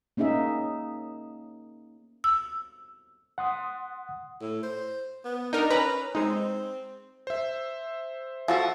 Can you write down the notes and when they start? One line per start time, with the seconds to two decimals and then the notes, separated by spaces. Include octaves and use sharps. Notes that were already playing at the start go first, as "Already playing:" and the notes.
0.17 A#3 C#4 D#4 G#4 E5
2.24 E6
3.38 F#5 C6 D#6
4.41 A2
4.63 C5
5.25 B3
5.53 D4 D#4 A#4
5.70 C#4 B4 A#5 B5
6.15 G#3 C4 D#4
7.27 C5 E5
8.48 F3 F#4 A4